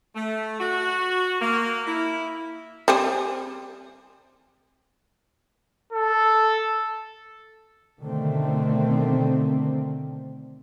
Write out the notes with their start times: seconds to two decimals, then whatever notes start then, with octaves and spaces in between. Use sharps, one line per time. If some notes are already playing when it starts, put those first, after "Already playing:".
0.16 A3
0.60 F#4
1.41 A#3
1.87 E4
2.88 G3 C4 G#4
5.93 A4
8.01 B2 D3 D#3 A3 C4